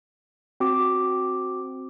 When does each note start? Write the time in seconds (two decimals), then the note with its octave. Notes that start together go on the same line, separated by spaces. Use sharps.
0.60 C4 F#4 D6